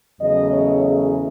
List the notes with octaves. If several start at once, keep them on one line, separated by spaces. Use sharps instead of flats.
E2 C#3 F#3 A3 D#5
C#5
G#4